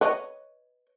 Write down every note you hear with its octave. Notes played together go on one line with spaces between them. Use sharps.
B4 C#5 D#5